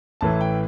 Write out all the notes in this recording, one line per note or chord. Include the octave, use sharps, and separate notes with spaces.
A1 A2 E3 A5
G5